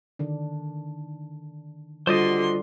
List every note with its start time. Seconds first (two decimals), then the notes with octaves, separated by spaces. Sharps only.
0.19 D3 D#3 D4
2.07 D3 G3 F4 F#4 C5 D5 D#5 C6